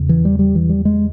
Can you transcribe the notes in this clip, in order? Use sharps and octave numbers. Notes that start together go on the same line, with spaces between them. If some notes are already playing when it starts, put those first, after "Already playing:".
Already playing: E2 C#3
E3
G3
G3
E3
G3
G#3